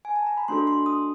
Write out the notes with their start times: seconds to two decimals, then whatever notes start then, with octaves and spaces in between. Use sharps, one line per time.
0.05 G#5
0.15 A5
0.26 A#5
0.37 B5
0.48 A3 D4 F#4 A4 C6
0.67 C6
0.86 D#6